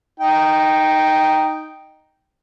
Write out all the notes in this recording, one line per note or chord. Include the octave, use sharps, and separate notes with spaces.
D#4 G5